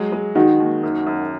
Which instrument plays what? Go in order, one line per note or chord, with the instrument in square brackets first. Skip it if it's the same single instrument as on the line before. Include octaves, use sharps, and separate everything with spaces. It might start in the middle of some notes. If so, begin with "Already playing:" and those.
Already playing: [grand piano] F#3 G#3
G#3
[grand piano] D#3 [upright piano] D#4 F#4
[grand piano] D#2
F#2
F#2